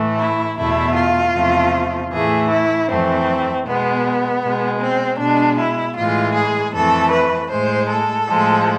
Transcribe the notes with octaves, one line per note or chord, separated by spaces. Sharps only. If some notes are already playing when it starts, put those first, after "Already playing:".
Already playing: A2 E3 A3
E4
E2 B2 A3 E4
F4
E2 C3 F3 A3
A2 E3 A3 G#4
E4
F2 E3 A3 C4
B2 G#3 B3
B2 G#3
C4
B2 G#3 D4
E4
A2 E3 G#3 F4
G#4
F2 E3 A3 A4
B4
A2 G#3 C5
A4
A2 F3 G#3